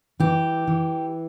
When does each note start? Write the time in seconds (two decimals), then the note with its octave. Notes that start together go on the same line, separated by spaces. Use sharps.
0.20 E3 G4
0.67 E3